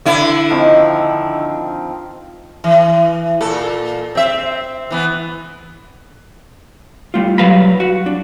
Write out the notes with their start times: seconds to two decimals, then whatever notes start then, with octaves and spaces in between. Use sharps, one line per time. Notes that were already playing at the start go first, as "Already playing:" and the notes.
0.05 D3 E4
0.50 D#3 F3 C4
2.64 E3
3.41 A#2 A4
4.15 C4 E5
4.90 E3 B3
7.14 G3 A3 F4
7.38 F#3 G3 B4 F5 A#5 B5
7.80 F#4
8.06 D4